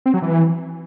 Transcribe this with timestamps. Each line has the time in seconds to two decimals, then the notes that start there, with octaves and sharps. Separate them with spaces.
0.06 C4
0.14 F#3
0.22 E3